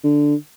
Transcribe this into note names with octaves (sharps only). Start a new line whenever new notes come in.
D3